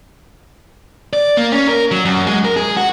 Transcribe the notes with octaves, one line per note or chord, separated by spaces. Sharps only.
D5
A#3
C#4
A#4
F#3
F#2
G#3
A#4
G#4
F#4